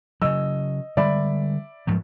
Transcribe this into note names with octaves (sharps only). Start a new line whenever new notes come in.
C#3 F#3 D#5 E6
D3 G3 G#3 D5 E5 B5
G#2 F3 F#3